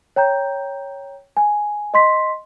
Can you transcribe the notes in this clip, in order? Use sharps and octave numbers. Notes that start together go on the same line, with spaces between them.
C#5 G5 A#5 G6
G#5
D#5 C6 B6